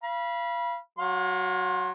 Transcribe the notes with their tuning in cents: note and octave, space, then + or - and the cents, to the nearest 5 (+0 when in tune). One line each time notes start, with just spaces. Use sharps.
F5 -30 B5 -25
F#3 +0 F5 +40 C6 +30